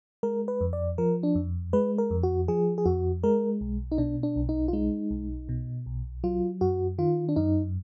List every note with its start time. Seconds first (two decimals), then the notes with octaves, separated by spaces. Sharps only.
0.23 G#3 A#4
0.48 B4
0.61 F2
0.73 D5
0.98 F3 A#4
1.23 D4
1.35 F2
1.73 G#3 B4
1.98 A#4
2.11 F2
2.23 F#4
2.48 F3 G#4
2.78 G#4
2.85 F2 F#4
3.23 G#3 A#4
3.61 B1
3.92 D#4
3.98 B2 D4
4.23 D4
4.36 B1
4.49 D#4
4.68 F4
4.73 G#3 D#4
5.11 B1
5.49 B2
5.86 B1
6.24 F#3 F4
6.61 F#2 F#4
6.98 D#3 F4
7.29 D4
7.36 F#2 D#4